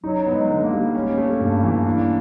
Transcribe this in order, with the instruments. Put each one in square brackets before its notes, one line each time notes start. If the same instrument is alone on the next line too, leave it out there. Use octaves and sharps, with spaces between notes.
[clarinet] F#3 [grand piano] D#4
[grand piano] B3
[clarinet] G#3
[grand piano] D3
[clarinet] A#3
[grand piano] G3
C#4
A3
G2
E3
D4